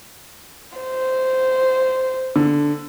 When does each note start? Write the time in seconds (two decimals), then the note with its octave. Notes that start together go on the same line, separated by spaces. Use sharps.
0.77 C5
2.36 D3